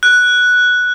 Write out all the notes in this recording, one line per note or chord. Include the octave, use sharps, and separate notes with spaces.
F#6